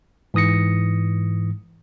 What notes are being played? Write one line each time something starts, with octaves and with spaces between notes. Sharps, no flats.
G#2 E3 D#6 A#6 C#7